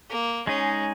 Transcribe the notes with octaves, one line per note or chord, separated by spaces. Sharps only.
A#3
G#3 C#4 D#4 G#4